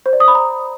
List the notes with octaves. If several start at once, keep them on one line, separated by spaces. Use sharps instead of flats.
C5
D5
D#6
B5
A#5